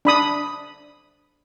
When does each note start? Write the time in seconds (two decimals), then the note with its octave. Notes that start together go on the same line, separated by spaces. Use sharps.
0.05 D4 B5 D#6